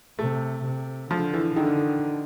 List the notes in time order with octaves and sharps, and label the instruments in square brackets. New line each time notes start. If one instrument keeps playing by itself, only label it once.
[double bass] C3 [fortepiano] A3
[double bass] C3
[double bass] D3 [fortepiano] F3
[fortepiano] E3
[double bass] D3 [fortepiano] D#3